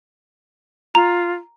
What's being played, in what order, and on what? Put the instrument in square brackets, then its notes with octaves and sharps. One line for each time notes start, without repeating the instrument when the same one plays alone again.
[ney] F4 [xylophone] A#5